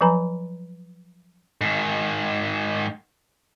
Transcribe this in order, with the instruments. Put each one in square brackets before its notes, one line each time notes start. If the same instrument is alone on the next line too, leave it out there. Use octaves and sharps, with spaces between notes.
[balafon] F3 F#3 B4 G#5 A#5 B5
[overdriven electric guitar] G#2 D#3